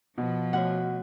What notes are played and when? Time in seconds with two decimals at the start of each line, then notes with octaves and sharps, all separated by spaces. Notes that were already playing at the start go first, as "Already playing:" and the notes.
0.18 B2 F3
0.53 A3 F#4 C#5 F#5